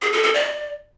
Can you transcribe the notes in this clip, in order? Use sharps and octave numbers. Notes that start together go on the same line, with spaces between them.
G#4
A4
A4
D5